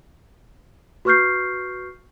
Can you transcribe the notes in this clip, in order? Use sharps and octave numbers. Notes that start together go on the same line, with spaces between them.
F#4 B4 C#6 F6 G6 C7